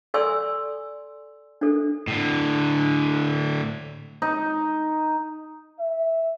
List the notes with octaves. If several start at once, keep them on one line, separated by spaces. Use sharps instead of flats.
A4 D5 G#5 C6 C#6 E6
D4 A4
A2 D3
D#4
E5